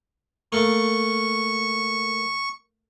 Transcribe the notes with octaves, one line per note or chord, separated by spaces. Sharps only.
A3 A#3 C#6